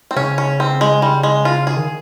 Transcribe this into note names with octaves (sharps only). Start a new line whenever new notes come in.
C4
C#3 C#4
C#4
C4
G#3
G3
G#3
F4
G#4
D#3